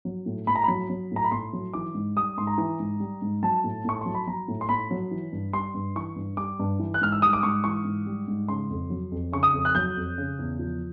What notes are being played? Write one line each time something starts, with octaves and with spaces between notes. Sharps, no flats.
F#3
A2
A2 B5
A#5
F#3 B5
F#3
A2 A#5
B5
A2 C6
F#3
E3 D6
G#2
G3 D#6
G#2 C6
A#5
E3
G#2
G3
G#2
F#3 A5
A2
A2 C#6
F#3 C6
B5
F#3 A#5
A2
C6
A2 B5
F#3
E3
G2
G3 C6
G2
E3 C#6
G2
G3 D6
G2
E3
F#6
G#2 F6
E6
G3 D#6
D6
G#2 C#6
E3 C#6
G#2
G3
G#2
C#3 C6
F2
F#3
F2
C#3 C#6
D#6
F2
F#6
F#3 G6
F2
C#3
E2
F3